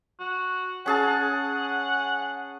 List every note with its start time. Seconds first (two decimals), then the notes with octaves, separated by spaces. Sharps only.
0.20 F#4
0.86 C#4 G#4 F#5 A5